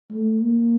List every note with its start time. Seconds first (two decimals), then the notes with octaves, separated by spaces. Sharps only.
0.11 A3
0.42 A#3